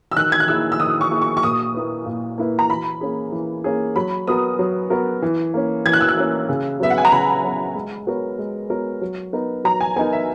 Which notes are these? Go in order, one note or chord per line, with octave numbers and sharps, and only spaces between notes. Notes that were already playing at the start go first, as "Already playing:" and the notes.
E6
D#3 F#6
G#6
F#6
A#3 E4 G#4 E6
E6
D#3 D#6
C#6
A#3 E4 G#4
C#6
C#6
A#2 D#6
A#3 E4 B4
A#2
A#3 E4 B4
A#5
E3 B5
A#3 C#4 G#4
E3
A#3 C#4 G#4
F#3 B5
B3 F#4 A#4 D#6
F#3
B3 F#4 A#4
E3
A#3 C#4
E3 G#6
F#6
E6
F#6
A#3 C#4
C#3
F#3 B3 E5
F#5
G#5
A#5
C#3 B5
F#3 B3
G#3
B3 F#4 A#4 C#5
G#3
B3 F#4 A#4 C#5
F#3
B3 D#4 A#4
F#3 A#5
G#5
B3 D#4 A#4 G#5
E5